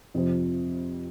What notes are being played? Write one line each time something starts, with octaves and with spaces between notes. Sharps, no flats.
F2 C3 F3 C4